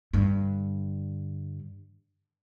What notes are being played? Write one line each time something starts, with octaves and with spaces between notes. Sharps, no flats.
G2 D3